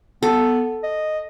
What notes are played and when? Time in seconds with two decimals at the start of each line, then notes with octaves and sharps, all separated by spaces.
0.23 B3 A4
0.83 D#5